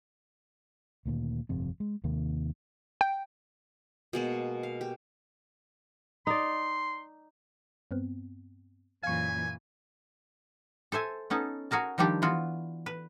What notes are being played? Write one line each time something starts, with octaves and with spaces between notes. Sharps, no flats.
D2 A#2 D3 D#3
G1 F2 C3
G#3
D#2 C3 D#3 A#3
G5
B2 G#3 A#3
F5
G4
D#4 D5 C6
G2 B3 C4
F#2 A#2 E3 F5 G#5 C#6
A4 C5 E5 G#5
B3 C#4 D#4 A4
F#4 G#4 A#4 A5
D#3 F3 G3 D4 G4
E3 B3 F4 F#4
B4